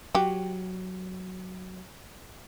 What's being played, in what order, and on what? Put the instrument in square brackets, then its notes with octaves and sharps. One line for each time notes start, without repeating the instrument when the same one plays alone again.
[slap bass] F#3 [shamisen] F#4 G4